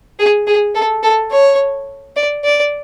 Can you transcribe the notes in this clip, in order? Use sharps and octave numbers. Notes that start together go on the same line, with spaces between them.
G#4
G#4
A4
A4
C#5
D5
D5